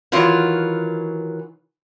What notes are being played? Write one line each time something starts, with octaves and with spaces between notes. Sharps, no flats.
D#3 E3 F#3 F4